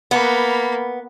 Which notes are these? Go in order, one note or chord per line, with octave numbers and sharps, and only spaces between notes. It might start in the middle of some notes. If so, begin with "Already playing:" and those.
A#3 B3 B5